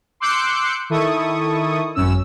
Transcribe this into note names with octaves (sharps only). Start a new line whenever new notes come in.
C6 D6 E6 F#6 G6 C#7
D#3 E4 A4 C#6 D#6
G#1 F#2 C#4 E6